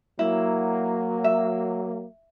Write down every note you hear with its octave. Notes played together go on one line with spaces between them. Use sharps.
F#3 A#3 E4
E5